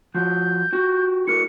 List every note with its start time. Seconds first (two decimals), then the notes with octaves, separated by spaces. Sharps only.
0.15 F3 F#4 G6
0.73 F#4 G4
1.27 E4 F#4 A#4 C#7